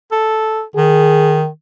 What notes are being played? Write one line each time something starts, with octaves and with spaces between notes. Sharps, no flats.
A4
D#3 G#4